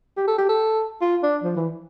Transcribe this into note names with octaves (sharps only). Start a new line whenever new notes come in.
G4
A4
G4
A4
F4
D4
F3
E3